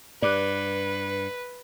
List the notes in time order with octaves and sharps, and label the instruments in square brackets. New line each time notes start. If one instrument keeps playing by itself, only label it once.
[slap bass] G2 [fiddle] B4 [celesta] D5 D6 F#6